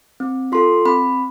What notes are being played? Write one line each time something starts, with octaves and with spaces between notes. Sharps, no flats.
C4
F4 A4 C6
C4 B5